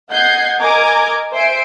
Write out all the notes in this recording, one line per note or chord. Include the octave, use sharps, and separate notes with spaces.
D#5 F#5 G6 G#6 C7
A#4 D#5 G#5 A#5 D6 G#6
C5 E5 G#5 C7 D7